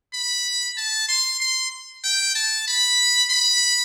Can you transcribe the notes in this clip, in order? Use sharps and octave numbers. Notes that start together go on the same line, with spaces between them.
B5
A5
C6
C6
G5
A5
B5
B5